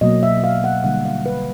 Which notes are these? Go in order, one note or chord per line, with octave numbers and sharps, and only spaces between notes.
B2 F#3 A#3 D#5
E5
F5
F#5
D3 G3 A#3 F#5
F5
B4